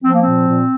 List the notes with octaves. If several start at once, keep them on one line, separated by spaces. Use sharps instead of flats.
F3 C4
A#3
A#2 C4
A#2